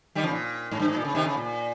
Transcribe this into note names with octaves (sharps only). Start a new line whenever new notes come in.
D#3 G3
C#3 F3
A#2
G#2
G2
G#2
A#2
C#3
C3 D#3
C#3
A#2